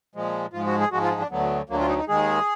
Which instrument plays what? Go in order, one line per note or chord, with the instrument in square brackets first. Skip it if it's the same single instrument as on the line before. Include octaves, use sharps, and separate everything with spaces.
[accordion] A#2 F3 G#3
G#2 F3 G#3 F4
F#4
G#4
G#2 F3 G#3 F#4
F4
D#4
D4
D2 D3 F#3 B3
D2 D3 F#3 A#3
F4
D#4
D#4
D#2 D#3 G#3 G#4